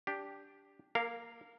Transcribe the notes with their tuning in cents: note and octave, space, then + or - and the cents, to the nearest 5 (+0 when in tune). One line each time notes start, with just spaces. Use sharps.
D4 -15 G4 +5
A#3 +10 A#4 -25 F5 +0